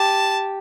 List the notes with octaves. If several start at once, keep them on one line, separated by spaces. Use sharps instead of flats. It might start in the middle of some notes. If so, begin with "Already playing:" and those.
Already playing: G4 A5